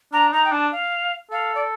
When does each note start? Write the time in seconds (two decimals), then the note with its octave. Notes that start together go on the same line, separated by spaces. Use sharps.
0.13 D4 A#5
0.33 D#4 A#5
0.45 G5
0.52 D4 A5
0.72 F5
1.31 A4 F5
1.55 D5